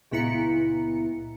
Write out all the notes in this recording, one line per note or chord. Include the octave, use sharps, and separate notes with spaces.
C#2 A#2 B3 E4 A#5 C#7